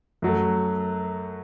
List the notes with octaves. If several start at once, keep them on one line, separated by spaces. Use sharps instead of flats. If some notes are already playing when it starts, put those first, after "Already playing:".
F#2 F#3 A3